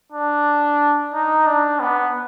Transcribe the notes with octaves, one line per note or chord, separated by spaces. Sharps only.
D4
D#4
D4
B3